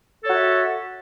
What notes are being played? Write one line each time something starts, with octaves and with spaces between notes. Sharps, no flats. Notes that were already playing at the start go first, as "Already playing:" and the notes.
F#4 A4 C#5 E5